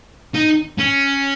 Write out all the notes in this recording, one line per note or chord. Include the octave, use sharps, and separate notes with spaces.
D#4
C#4